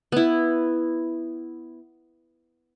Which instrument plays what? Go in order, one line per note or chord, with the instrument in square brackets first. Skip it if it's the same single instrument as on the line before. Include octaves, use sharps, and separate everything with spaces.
[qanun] B3 E4